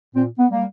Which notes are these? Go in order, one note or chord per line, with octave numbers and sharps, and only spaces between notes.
A#2 C4
B3
G3 A#3